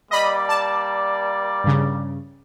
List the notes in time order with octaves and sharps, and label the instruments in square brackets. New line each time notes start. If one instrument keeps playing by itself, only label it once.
[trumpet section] G3 A#3 D5 [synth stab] D#5 B5
[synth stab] A5
G2 C#3